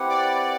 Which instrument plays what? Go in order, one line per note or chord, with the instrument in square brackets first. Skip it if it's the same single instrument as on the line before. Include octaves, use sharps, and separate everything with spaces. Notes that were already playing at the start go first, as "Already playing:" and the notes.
Already playing: [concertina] C4 E4 G4 B4 F#5
[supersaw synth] D5